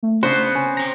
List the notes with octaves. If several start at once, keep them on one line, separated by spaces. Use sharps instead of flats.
A3
C#3 B3 C4 D4 F#4 C5 F#6
C#4 G#5
C4 A#5